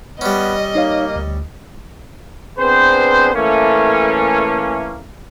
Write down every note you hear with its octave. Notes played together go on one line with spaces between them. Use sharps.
G3 B3 C#4 D#5
A#3 D#4 C#5 F5
D2
B3 C4 D4 G#4 B4 C5
E3 A3 A#3 C#4